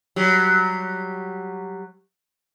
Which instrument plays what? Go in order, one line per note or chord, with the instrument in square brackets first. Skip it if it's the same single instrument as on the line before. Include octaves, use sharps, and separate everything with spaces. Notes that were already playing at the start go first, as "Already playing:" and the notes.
[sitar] F#3 G3 G4